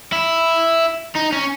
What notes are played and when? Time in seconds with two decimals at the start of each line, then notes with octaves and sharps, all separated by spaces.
0.12 E4
1.16 D#4
1.33 C#4